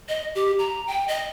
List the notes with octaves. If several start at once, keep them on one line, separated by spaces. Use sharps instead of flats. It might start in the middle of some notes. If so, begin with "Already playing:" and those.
D#5
G4
A#5
G5
D#5